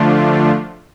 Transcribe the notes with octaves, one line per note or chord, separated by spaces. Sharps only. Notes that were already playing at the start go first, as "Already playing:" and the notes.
Already playing: D3 F3 A3 D4 F4